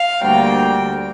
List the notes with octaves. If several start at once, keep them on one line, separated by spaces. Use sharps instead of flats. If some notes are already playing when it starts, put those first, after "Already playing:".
Already playing: F5
D2 D3 G3 A#3 G5